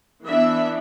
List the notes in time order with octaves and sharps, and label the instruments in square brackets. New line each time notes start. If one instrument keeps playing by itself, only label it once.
[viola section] E3 B3 D4 E5